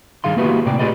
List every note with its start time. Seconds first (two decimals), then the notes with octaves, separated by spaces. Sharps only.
0.24 G2 D#3 G#4 F5 C6
0.37 A#3 B3 E4 F#4 G4 B4
0.66 A2 C3 D5 G5
0.79 F4 G4 G#4 B4 D5 D#5